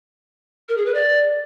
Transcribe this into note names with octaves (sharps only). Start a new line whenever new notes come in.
A#4
G#4
B4
D5